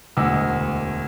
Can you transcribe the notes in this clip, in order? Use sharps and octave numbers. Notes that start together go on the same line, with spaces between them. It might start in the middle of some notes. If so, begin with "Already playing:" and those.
E1 D2 D#5 F#5 D6 E6